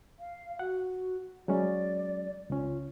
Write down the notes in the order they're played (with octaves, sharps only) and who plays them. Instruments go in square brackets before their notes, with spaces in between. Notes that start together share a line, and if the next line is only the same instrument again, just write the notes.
[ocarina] F5
[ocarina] F#4 [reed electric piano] F#5
[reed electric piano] F#3 G#3 C#4 [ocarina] D5
[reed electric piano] C#2 C#4 [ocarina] F4